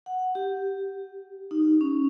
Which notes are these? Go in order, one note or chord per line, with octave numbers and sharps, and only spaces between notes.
F#5
G4
D#4
C#4